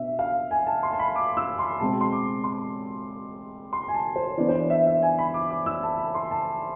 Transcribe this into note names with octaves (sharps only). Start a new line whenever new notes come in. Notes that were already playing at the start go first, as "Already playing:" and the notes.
Already playing: B2 B3 D4 E5
F5
G#5
A5
C6
A5
B5
D6
E6
C6
B2 G#3 C4 A5
C6
D6
C6
C6
G#5
A5
C5
E3 B3 D4 D5
C5
D5
E5
E5
G#5
B5
D6
D6
E6
A5
B5
C6
A5